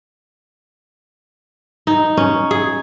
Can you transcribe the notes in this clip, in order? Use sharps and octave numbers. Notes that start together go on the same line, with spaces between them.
D#4
C#4
G#4